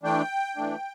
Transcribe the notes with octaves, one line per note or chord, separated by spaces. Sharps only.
E3 A3 D4 G5
E3 A3 D4